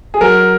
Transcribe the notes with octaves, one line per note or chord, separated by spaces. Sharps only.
G#4
F#3 A#4